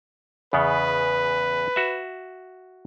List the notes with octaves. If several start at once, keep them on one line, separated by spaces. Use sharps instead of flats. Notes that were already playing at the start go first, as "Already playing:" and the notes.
E2 C#3 B3 B4
F#4 E5